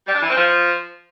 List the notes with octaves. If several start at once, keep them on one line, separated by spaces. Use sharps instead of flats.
G3
D4
E3
C4
F3